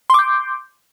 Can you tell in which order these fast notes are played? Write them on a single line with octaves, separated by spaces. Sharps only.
C6 D6 G6